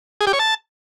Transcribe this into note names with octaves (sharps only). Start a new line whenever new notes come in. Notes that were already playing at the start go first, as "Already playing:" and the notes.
G#4
G4
C#5
A5